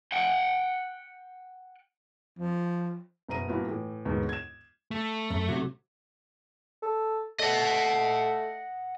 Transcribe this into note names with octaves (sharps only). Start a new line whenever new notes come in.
F#5 G5
F3
F#1 B2 A#5 D#7
G2 A#2 A#3 B3 E4 F#4
A2 E3
D#2 G#2 B2 D3 E3 B3
G#6 E7
A3
F#2
B1 C3 F#3
A4
A3 D#5 F#5